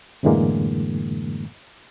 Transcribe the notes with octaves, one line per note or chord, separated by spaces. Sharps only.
F#2 A2 D3 E3 G#3 A#3